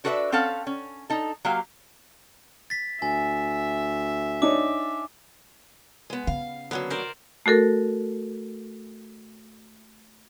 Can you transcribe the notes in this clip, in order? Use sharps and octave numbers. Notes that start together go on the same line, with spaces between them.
D4 F#4 A4 B4 D#5 E5
C4 C#4 A4 F5 F#5
C#4
D#4 A4
F#3 A#3 G4 F5
A6 B6
D2 E5 G#5
D4 D#4 C#5 D6
G#3 B3
C#3 F5
D3 F#3 A#3 B3
A#4 C5 D5
A3 F#4 A4 A#4